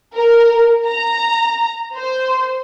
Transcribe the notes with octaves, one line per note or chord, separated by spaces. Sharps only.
A#4
A#5
C5